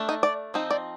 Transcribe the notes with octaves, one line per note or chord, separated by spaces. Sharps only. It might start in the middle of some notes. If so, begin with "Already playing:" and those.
Already playing: A3 D4
D#4
D5
F3 C4 D#4
D5